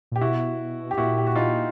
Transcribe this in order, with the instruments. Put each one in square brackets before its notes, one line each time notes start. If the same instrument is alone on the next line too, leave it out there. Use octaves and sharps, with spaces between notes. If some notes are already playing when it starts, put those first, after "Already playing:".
[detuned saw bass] A#2 [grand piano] G4
[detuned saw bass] B2 [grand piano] E4 F#4
[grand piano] G4
[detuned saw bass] A#2 [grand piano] E4 F#4
[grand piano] G4
F#4
D#4 F4